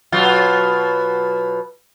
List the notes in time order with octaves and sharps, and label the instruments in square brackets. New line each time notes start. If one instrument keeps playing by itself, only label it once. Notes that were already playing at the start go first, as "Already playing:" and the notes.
[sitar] B2 F#3 F4